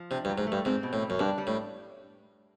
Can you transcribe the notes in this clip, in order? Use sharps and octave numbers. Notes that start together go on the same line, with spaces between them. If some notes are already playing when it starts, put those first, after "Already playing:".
Already playing: F3
C3 D4
G2
F#3
G#2
A3
G2
G#2 C4
B2
A2
G3
F#2
G2 D4
G3
A2